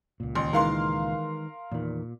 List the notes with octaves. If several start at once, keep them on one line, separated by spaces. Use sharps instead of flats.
C#2 A#2
A1 D#2 C6
D#3 E3 G#3 A#4 F5 C6
E2 A#2 D#3